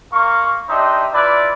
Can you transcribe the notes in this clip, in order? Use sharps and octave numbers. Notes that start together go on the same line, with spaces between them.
G#3 A#3 F5 C#6
D4 D#4 G4 C5 D#5 E5
D4 E4 F4 B4 D5